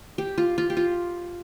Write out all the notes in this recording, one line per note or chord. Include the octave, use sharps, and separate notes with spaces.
G4
F4
F4
G4
F4